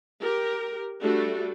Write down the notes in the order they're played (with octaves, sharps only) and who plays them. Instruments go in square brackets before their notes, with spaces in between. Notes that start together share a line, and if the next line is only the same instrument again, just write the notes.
[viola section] G4 A#4
G3 A3 D4 F#4 A4